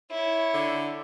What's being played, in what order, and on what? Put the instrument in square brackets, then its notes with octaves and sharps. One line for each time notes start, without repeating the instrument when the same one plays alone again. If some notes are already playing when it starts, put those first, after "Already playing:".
[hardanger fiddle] E4 C#5
[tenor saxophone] D3